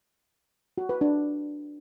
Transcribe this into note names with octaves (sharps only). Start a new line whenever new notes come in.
F#4
B4
D4